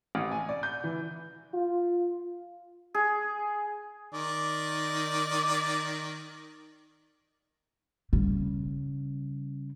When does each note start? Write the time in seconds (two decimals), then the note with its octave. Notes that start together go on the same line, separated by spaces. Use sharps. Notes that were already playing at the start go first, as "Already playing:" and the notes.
0.15 A1
0.31 G#5
0.49 D5
0.63 G6
0.84 E3
1.54 F4
2.94 G#4
4.13 D#3 D5
8.13 C#3 G3